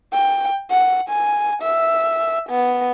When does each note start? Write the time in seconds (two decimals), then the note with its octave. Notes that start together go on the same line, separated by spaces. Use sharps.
0.13 G5
0.70 F#5
1.09 G#5
1.62 E5
2.49 B3